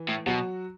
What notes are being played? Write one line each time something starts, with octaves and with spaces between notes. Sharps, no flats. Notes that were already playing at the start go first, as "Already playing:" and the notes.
Already playing: E3
A2
B2 F#3 F#4